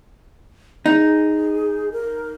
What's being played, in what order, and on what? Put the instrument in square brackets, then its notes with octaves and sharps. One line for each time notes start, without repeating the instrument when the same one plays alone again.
[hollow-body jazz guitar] D#4 [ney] G#4
[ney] A#4